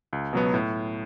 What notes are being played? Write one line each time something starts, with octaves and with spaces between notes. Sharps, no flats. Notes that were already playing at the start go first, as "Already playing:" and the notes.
C#2
B2 F#3 B3
A2